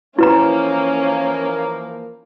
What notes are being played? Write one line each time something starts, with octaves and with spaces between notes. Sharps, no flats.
E3 F3 A#3 C#4 E4 B4 A#5